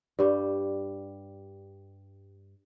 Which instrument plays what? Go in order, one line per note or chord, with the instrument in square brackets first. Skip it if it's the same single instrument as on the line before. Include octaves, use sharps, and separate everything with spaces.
[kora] G2 G3